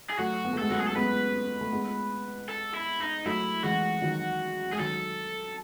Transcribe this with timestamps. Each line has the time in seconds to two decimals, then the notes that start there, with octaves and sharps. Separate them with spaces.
0.10 G#4
0.18 F#3 A3 F#4
0.45 B3
0.53 A3
0.58 G#3 B3 A4
0.70 F#3 A3 F#4
0.79 G#4
0.87 A4
0.96 G#3 B3 B4
1.61 A3
1.72 G#3 B3
2.49 A4
2.75 E4
3.01 D#4
3.26 F#3 A3 E4
3.63 E3 G#3 F#4
4.02 D#3 F#3
4.72 G#3 G#4
4.79 D#3 F#3 A4